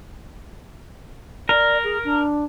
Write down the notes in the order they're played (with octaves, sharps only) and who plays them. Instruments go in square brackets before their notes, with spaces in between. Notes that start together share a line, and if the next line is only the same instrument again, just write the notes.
[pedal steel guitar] A#4 [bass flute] D5
[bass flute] G#4
D4